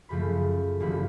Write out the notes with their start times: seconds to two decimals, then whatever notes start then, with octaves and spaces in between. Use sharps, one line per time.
0.09 F#2 C#3 F3 A3 B5
0.80 G#1 G2 D3 F3 A3 B5